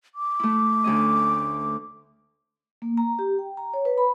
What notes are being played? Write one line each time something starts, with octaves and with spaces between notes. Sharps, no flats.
D6
A3 E4
D2 C#4 D#5
A#3
A#5
G4
G5
A#5
C#5
B4
B5